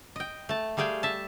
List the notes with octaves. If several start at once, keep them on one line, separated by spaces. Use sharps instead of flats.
D#5 G5
A3 A5
G3 A3 G#4 F5 G5 G#5
E5 A5